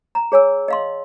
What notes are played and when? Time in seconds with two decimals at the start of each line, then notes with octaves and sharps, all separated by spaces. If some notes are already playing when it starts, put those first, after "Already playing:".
0.15 A#5
0.32 G#4 C#5 G#5 E6
0.68 D#5 F5 C6